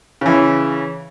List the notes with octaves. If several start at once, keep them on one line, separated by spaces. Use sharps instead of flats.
C#3 E3